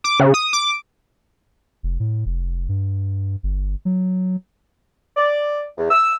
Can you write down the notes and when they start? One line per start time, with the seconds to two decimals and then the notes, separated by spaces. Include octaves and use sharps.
0.04 D6
0.20 C#3
0.34 D#6
0.53 D6
1.83 F1
2.00 A2
2.26 F1
2.69 G2
3.43 G1
3.85 F#3
5.16 D5
5.77 E2
5.90 E6